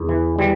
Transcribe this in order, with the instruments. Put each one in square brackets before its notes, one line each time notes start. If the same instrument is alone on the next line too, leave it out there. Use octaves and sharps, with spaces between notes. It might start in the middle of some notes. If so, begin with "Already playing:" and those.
Already playing: [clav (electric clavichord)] E2
E3
E3 G3